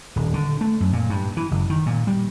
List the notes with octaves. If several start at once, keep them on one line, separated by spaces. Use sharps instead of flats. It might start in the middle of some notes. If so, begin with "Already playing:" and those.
D#1
D3
A3
F#2
A#2
G2
E3
F#1
D#3
A#2
G3